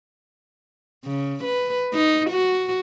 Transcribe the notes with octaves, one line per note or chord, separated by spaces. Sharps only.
C#3
B4
D#4
F#4